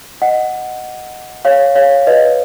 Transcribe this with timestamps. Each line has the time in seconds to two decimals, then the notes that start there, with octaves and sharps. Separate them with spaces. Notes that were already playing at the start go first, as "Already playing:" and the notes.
0.22 D#5 F#5
1.45 C#5 F5
1.76 C#5 F5
2.07 B4 D#5